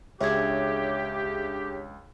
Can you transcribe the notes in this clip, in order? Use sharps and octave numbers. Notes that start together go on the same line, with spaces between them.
C#2 D4 G4 G#4 C#5 E5 G#6